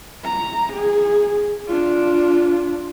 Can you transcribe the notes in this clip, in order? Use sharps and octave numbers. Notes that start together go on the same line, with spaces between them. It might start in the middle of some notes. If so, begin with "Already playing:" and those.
A#5
G#4
D4 F4